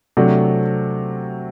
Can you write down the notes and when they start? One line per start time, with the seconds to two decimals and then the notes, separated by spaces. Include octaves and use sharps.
0.17 C3 F#3 A3 D4